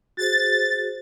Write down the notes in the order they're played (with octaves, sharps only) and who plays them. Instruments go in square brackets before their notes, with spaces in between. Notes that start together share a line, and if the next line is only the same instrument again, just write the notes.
[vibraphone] F#4 G#4 C5 [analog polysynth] A6